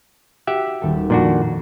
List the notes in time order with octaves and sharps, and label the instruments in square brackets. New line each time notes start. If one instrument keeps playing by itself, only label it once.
[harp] F#4 [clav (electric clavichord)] G4 E5 F#5
[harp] D#1 A4
[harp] F2 [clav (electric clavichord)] A#2 D4 F#4